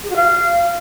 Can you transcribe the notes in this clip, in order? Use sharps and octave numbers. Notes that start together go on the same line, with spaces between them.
G#4
F#4
F5